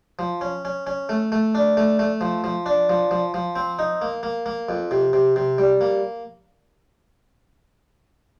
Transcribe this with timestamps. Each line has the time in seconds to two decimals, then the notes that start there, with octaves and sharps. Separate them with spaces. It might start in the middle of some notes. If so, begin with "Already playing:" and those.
0.19 F3
0.41 C#4
0.65 C#4
0.87 C#4
1.09 A3
1.32 A3
1.55 D4
1.77 A3
1.99 A3
2.21 F3
2.44 F3
2.66 D4
2.89 F3
3.11 F3
3.34 F3
3.56 C4
3.79 D#4
4.02 A#3
4.23 A#3
4.46 A#3
4.69 F2
4.91 C3
5.13 C3
5.36 C3
5.58 G3
5.81 A#3